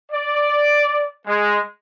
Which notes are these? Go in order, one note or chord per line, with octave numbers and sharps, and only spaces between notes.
D5
G#3